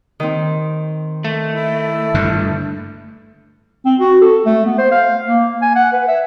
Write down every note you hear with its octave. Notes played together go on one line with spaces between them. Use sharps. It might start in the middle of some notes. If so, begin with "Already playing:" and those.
D#3 C4
A3
E4
G2 D3
C4
F#4
A4
A3
B3
C5
F5
A#3
G#5
F#5
B4
E5